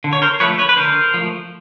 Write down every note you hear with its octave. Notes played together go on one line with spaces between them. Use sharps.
D3
C#5
A#4 C5
F3 A3 B4 C#5
B4 C#5
B4
D3 A#4 C5
F3 A3